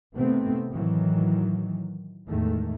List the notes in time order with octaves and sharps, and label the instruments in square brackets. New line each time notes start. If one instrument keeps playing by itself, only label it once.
[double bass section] C3 D#3 A3 B3 C4
A2 D#3 E3 F#3
E2 A2 D#3 G#3 A3